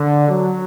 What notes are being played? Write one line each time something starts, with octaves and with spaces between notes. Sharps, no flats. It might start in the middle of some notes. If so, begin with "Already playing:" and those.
Already playing: D3
F#3